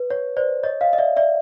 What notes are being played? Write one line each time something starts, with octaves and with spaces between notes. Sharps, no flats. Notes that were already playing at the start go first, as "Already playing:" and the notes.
Already playing: B4
C#5
C5 D5
C#5 D#5
D#5 F5
D#5
D5 E5
D5 E5